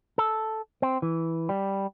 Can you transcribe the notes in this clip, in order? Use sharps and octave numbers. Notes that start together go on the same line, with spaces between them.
A4
C4
E3
G3